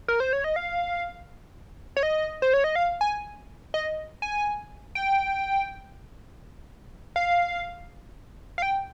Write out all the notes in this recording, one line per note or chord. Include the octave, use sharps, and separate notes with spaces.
A#4
C5
C#5
D#5
F5
C#5
D#5
C5
C#5
D#5
F5
G#5
D#5
G#5
G5
F5
F5
G5